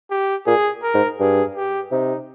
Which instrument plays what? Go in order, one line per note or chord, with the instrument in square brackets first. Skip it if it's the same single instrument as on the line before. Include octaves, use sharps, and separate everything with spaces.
[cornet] G4
[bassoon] A#2 [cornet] G#4
[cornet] A#4
[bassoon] G#2
[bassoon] G2 [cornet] G#4
[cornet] G4
[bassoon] C3 [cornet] D#4